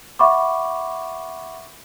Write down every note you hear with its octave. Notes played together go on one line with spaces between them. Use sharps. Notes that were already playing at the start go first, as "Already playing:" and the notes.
E5 F#5 B5 C#6 D6